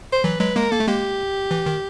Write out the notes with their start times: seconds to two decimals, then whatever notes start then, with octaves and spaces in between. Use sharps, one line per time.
0.13 C5
0.24 E3 F#3 B4
0.40 F#3 G#3 B4
0.56 G#3 A#3 A#4
0.72 A#3 A4
0.80 A3
0.87 G#3 A#3 G4
1.51 E3
1.66 D#3